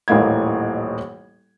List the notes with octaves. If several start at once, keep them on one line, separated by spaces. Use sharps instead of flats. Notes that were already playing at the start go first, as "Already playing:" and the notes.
D#1 A1 E3 A#3 D#5 G#6